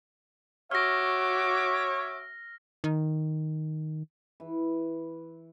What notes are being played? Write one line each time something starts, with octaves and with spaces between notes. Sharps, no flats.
F#4 C#5 E5 D6 F6 A#6
D#3
E3